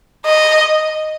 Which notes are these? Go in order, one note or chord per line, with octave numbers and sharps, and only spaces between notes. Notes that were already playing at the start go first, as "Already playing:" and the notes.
D#5